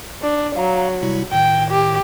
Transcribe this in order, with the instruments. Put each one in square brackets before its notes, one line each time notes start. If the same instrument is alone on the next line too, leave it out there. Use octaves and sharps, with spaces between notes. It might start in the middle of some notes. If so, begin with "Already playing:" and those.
[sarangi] D4
[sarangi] F#3 [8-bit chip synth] F5 A#5
[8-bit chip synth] C3 G3 E4
[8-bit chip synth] A2 D#3 [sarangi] G5
[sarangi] G4